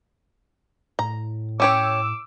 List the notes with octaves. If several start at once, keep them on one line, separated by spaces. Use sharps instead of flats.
A2 A#5
C#4 G4 C#5 D6 E6